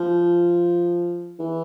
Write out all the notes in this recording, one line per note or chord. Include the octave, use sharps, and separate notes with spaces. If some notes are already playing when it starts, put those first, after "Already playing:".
Already playing: F3
E3